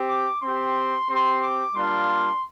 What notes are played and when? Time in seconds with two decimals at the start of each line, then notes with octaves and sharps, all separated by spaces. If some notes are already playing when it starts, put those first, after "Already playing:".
Already playing: C4 G4
0.09 D6
0.42 C4 G4 C6
1.09 C4 G4 C6
1.41 D6
1.75 G3 A#3 D4 F4 C6